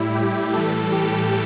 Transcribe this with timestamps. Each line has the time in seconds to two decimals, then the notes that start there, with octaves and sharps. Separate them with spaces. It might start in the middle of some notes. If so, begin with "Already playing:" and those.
Already playing: A2 G3 E4
0.15 G4
0.54 A2 E3 G3 A4
0.92 G4